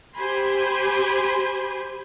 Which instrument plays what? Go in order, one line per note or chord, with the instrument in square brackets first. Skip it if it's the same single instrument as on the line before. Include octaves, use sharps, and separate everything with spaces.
[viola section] G4 C5 G#5 B5 C6